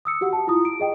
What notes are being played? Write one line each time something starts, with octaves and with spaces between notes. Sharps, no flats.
D#6 E6 C#7
F#4 G4 F#5
A5
E4 F4 A#5 D#6
D7
G#4 D#5 G5